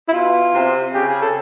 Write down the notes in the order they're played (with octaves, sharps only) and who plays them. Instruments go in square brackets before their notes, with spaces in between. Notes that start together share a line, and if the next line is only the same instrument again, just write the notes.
[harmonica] E4
[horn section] B2 [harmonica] F4
[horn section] C3
[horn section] C#3 [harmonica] G4
[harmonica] G#4
A4